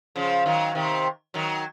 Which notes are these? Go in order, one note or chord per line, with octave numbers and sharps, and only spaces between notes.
C#3 F3
D#3 F#3
C3 D#3
D#3 F#3